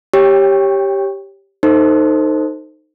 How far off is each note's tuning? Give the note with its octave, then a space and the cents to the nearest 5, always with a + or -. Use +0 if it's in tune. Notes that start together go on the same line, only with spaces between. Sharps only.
G4 +0 C#5 -5 G5 +25
D#4 -5 A4 +25 C5 +0